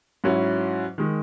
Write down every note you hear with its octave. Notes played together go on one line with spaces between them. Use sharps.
G#2 F#3 C#4 E4
D#3 G#3